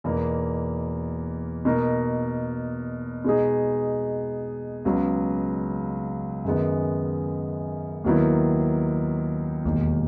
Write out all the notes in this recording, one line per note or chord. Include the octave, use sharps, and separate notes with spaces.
E2 B2 A#3 D#4
B2 A#3 D#4 A#4
B2 G#3 D#4 G#4
C#2 C#3 F#3 B3
F#2 D#3 G#3 B3
D#2 D#3 F#3 B3 E4
E1 D#2 D#3